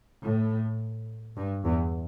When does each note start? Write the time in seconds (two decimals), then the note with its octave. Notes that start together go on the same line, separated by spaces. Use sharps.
0.23 A2
1.37 G2
1.65 E2